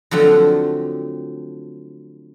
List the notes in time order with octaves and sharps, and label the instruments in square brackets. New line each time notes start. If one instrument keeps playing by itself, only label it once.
[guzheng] D3 F3 F#3 A3 C4